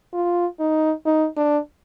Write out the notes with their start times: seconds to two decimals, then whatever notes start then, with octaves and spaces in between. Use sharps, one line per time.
0.13 F4
0.60 D#4
1.06 D#4
1.36 D4